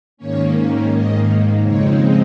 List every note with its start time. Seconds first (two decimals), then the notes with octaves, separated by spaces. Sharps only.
0.17 G#2 D#3 A#3 C#4 C#5
0.89 G#2 D#3 A#3 D#5
1.61 F2 C#3 G#3 C4 D#4 C#5